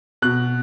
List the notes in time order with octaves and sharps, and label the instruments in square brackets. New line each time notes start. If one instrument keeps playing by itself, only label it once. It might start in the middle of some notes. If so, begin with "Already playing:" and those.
[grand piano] B2 F#6